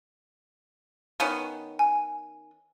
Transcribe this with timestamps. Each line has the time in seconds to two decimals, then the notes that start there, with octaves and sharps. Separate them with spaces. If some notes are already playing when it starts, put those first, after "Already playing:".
1.20 D#3 B3 C#4
1.79 G#5